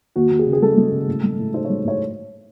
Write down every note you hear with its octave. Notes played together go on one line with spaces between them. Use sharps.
D#2 F#4
D#2
G#4
C#3
G#4
G#3 A4
G#3
C#3
A2
G#3
A2
D#4 C5
C#5
G#3
A2 C#5